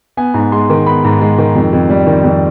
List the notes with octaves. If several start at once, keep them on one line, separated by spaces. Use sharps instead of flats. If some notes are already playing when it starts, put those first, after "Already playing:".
B3 G#5
G#2
G#3 C6
D#3
B3 B5
G#2
G#3
D#3
F2
F2
G3
D#3
F2